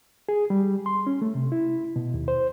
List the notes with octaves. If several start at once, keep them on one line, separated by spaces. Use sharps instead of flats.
G#4
G3
C6
C#4
A3
C3
E4
B2
D#2
C5